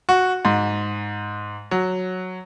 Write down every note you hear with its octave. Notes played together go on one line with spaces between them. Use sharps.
F#4
G#2
F#3